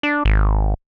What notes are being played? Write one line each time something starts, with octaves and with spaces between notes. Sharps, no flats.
D4
G#1